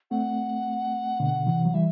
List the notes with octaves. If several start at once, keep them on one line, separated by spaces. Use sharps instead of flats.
A3 C4 F#5
B2 D3
C3 E3
F#3
E3 G3 E5